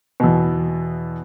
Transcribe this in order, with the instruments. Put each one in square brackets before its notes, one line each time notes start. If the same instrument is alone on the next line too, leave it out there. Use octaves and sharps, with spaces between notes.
[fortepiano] E2 B2